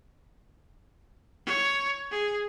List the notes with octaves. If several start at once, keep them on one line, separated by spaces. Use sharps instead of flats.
C#5
G#4